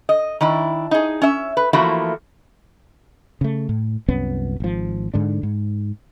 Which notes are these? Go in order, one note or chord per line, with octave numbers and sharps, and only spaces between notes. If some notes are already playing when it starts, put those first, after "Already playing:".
D#5
D#3 D4 E4
D#4 G#4
C#4 E5
B4
E3 F3 A3 A#3 E4 F#4
C#3 A3
A2
C2 F#2 B3 C#4
G#1 F3
G#2 D3 D4
G#2